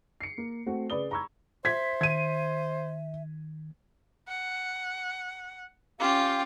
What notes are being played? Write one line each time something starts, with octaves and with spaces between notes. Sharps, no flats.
C7 C#7
A#3
A3 C4 F#4
C#3 B4 D5 D#6 G7
A#5 B5 C#6 E6 G#6
C5 E5 G#6 B6
D#3 G#6 D#7
F#5
C#4 F4 G4 F5 G5 D6